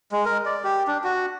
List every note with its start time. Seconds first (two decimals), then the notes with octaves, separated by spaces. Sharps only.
0.12 G#3
0.25 A#4
0.46 D5
0.64 G4
0.87 D4
1.04 F#4